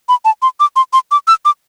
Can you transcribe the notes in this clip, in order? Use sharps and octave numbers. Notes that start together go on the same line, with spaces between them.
B5
A5
C6
D6
C6
C6
D6
E6
D6